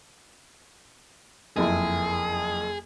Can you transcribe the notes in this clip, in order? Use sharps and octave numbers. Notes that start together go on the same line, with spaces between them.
F#1 F2 E4 G#4